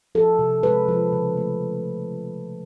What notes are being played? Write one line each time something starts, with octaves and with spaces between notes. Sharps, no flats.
F3 A4
C3
G#3 B4
F3
C#3
A3